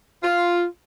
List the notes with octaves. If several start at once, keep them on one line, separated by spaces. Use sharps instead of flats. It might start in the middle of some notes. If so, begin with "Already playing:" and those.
F4